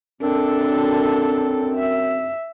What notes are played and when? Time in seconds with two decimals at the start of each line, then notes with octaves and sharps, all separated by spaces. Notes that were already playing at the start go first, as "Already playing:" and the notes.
0.22 F#2 C4 D4 A4
1.77 E5